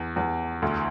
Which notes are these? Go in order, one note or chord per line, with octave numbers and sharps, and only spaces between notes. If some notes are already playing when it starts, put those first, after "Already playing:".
Already playing: E2
E2
D2